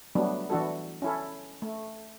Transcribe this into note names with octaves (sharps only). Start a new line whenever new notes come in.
F#3 G3 A3 B3 D4
E3 D4 F#4 A4
C#4 E4 A4
A3